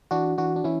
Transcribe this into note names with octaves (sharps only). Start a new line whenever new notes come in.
E3 D4 F#4
E3 D4 F#4
D4
E3 C#4 E4